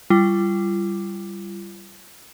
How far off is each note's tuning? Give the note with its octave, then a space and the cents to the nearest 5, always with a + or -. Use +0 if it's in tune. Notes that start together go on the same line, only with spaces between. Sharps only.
G3 +0 F4 -35